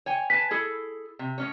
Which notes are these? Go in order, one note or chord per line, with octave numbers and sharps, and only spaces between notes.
C#5 G5 G#5
B4 G#5 A5 B6
E4 G#4 A4
C3
A2 C#4 C#5